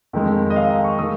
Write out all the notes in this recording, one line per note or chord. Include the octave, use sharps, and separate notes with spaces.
F2 D#3 G#3
D#5
F5
A#5
C#6
D#3 G#3 D#6